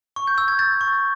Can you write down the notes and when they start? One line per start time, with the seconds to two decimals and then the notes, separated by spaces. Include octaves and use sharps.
0.16 C#6
0.27 G6
0.38 E6 G6
0.48 G#6
0.59 G6 A6
0.81 C#6